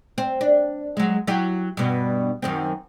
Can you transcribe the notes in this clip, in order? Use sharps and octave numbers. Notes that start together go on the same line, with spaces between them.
C4
D4
F#3 G#3
F#3 E4 G4
G2 B2
F#2 D#3 C4